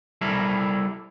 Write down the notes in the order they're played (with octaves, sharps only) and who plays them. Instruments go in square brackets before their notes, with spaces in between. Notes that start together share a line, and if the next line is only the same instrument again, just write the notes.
[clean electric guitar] G3 E4 A4 A#4